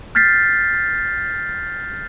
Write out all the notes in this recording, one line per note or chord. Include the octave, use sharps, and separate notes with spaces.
F6 G6 A6 B6 C7